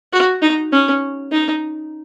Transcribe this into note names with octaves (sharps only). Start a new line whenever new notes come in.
F#4
D#4
C#4
D#4